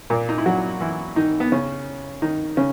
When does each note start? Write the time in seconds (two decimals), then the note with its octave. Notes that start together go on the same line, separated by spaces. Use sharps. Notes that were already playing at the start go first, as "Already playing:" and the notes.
0.10 A#2 A#3
0.29 D#4
0.38 E4
0.46 F#3 F#4
0.81 E3 E4
1.16 D#3 D#4
1.40 B3
1.52 C#3 C#4
2.22 D#3 D#4
2.57 C#3 C#4